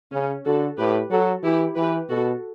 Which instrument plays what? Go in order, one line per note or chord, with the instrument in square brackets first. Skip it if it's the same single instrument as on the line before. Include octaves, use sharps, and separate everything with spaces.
[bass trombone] C#3 [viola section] C#4
[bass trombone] D3 [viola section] F#4 A4
[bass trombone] A2 [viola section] G4 B4
[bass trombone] F#3 [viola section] F#4 A4
[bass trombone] E3 [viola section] E4 G4
[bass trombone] E3 [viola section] G4 B4
[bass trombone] B2 [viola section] F#4 A4